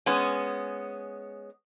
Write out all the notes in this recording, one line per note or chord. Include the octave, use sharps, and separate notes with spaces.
G#3 B3 C#4